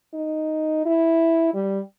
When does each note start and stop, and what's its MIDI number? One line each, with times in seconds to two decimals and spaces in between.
0.14 0.83 63
0.86 1.50 64
1.54 1.80 55